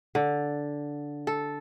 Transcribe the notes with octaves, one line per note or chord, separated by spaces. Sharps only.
D3
A4